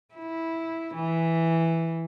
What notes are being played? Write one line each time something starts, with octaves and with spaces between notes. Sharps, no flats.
E4
E3